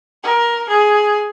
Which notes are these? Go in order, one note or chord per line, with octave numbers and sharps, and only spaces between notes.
A#4
G#4